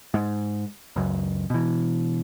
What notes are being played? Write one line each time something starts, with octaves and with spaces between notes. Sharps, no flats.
G#2
C#2 F#2
B2 E3